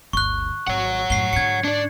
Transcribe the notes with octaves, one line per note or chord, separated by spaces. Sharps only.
G1 D2 C#6 F#6
G#1 C#5 F#5
F#2 A2 C7 G7
G#2 D3 G#6 C#7
D4 D5